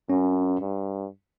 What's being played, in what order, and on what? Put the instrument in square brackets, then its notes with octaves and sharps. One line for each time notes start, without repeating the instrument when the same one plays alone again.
[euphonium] F#2 [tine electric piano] C#4
[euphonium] G2